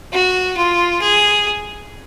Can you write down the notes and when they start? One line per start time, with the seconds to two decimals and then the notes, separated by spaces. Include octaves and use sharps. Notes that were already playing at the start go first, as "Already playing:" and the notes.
0.13 F#4
0.57 F4
1.01 G#4